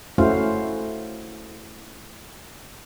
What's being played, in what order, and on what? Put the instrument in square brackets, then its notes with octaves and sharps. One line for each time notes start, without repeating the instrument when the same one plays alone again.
[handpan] A3 C#4 E4 F#4 C5 F5